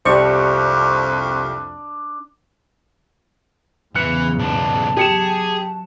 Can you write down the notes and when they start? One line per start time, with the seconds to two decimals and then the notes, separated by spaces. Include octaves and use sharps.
0.05 C2 F2 D4 G4 C5 C#6
3.96 E2 G#2 C#3 E3 F#6 C#7
4.39 B1 D4 A5
4.97 F#3 G4 G#4 C#7 E7